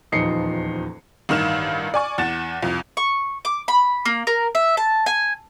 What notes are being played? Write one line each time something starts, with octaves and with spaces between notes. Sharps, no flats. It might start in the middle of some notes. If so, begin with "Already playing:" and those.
D#1 E2 F3 D#4 C7 C#7
A1 G2 D#3 F6 E7
D5 G#5 C#6
E2 F#5 A6 E7
C2 F2
C#6
D6
B5
A#3
A#4
E5
A5
G#5